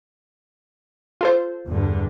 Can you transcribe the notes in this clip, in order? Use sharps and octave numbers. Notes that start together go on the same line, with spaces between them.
F4 A4 C5
E2 G2 D3